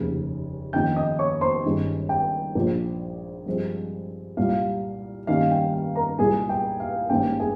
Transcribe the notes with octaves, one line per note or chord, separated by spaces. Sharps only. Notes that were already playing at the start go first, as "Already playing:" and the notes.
Already playing: F1 D#2 C#3
F2 D#3 A#3 C#4 G5 G6
D#5 D#6
C#5 C#6
C5 C6
G1 G2 D#3 G#3 C#4
G5
A#1 A#2 F3
G2 F3 G#3 C4
C2 A#2 G3 F5
G2 D#3 G3 A#3 C#4 F5
G5
F5
A#4 A#5
C2 A#2 G#3 G#4 G#5
G5
F5
G#1 G2 G3 A#3 C#4 G5
G#4 G#5